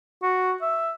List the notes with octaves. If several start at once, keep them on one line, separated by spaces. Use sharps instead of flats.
F#4
E5